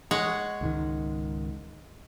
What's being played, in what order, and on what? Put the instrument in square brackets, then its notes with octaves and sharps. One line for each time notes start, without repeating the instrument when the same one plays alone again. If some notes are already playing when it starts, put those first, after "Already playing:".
[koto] G#3 C#5 F#5
[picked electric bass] C#2 G#2 D#3